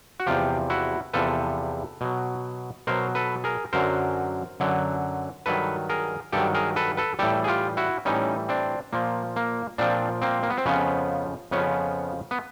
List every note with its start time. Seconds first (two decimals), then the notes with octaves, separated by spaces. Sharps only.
0.20 F#4
0.27 E2 C3 F3 F4 G4
0.70 E4 F#4
1.14 E2 C3 F3 A4 B4
2.01 B2 F#3
2.87 B2 F#3 A#4 C5
3.15 A4 B4
3.44 G#4 A#4
3.73 F#2 D3 F#3 A#4 C5
4.60 F#2 D3 F#3
5.46 G2 D#3 F#3 A4 B4
5.90 G#4 A#4
6.33 G2 D#3 F#3 G4 A4
6.55 G#4 A#4
6.76 A4 B4
6.97 A4 B4
7.19 A2 E3 G3 G4 A4
7.44 G#4
7.48 F4 G4
7.77 E4 F#4
8.05 A2 E3 G3 C#4 D#4
8.49 C4 D4
8.93 A#2 F3 A#3
9.36 A#3
9.78 A#2 F3 C4 D4
10.22 A#3 C4
10.43 A#3
10.50 B3
10.58 C4
10.66 F2 C#3 F3 B3 C#4
11.51 F2 C#3 F3 B3 C#4
12.31 B3